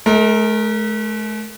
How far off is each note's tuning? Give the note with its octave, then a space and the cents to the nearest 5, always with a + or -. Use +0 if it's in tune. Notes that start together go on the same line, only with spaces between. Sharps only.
A3 -45 A#4 +0